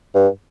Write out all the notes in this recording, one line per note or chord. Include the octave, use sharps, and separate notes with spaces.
G2